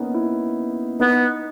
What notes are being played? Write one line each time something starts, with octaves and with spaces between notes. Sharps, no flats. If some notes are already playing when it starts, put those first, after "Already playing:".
Already playing: A#3 B3 C#4 D#4
E4
B3 D#4